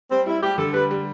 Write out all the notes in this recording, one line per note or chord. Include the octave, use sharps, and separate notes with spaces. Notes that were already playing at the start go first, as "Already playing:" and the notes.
G3 C4
G3 E4
G3 G4
D3 A4
G3 B4
G3